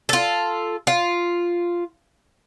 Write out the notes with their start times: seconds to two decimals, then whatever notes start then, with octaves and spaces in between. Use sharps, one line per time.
0.09 F4 A4
0.87 F4